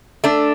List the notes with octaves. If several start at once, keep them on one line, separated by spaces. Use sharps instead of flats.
A3 D4